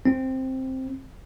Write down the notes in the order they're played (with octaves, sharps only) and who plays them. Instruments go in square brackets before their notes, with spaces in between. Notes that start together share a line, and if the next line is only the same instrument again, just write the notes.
[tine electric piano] C4